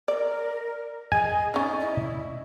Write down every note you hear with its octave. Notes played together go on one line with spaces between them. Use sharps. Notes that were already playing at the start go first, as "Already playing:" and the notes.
A#4 D5
G#4 D#5 G#5
C#4 D#4 D5
E4